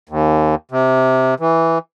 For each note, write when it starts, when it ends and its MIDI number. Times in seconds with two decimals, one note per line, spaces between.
0.09 0.55 39
0.71 1.34 48
1.40 1.78 52